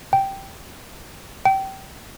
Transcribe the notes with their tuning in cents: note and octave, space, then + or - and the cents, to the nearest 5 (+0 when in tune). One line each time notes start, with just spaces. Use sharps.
G5 -5
G5 -25